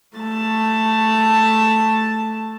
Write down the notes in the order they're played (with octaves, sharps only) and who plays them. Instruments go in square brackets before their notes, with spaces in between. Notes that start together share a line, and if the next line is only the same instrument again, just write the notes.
[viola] A3 A5